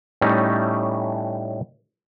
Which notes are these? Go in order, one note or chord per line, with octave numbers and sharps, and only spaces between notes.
A2 G3 A3 C#4 D#4